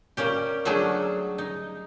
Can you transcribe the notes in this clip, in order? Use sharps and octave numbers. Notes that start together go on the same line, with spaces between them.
G3 A#3 C#4 G4
F#3 G3 A3 C#4 D4 G#4
D#4